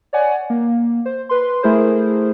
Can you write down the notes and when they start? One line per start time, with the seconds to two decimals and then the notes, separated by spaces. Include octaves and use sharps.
0.13 C#5 D5 F#5 G#5
0.50 A#3
1.06 C5
1.29 B4 C6
1.63 A3 E4 G#4 A#4 C5